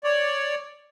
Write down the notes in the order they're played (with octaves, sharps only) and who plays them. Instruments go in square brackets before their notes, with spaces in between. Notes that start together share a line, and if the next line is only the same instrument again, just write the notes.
[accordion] C#5 D5